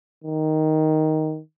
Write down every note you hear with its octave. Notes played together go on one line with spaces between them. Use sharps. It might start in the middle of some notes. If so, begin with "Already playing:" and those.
D#3